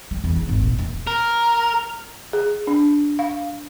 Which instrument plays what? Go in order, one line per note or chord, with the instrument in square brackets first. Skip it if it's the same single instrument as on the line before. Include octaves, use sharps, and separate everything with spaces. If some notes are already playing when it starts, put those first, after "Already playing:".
[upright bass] G3
E2
E4
G#1
A#2
D#1
[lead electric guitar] A#4
[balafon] G#4
D4
F5